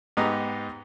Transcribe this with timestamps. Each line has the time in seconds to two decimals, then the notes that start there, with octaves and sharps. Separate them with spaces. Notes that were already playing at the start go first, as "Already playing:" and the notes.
0.17 G#2 B3 D#4 G4 A#5 D#6